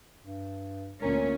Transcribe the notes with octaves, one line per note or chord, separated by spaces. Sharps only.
G2
D2 A#2 C#4 A#4